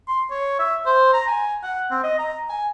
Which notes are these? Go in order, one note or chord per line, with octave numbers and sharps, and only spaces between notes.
C6
C#5
E5
C5
A#5
G#5
F#5
C4
D#5
A#5
G#5